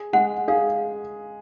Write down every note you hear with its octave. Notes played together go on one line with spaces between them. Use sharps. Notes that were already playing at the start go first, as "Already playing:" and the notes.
Already playing: G#4
G#3 F#5
G#4 F5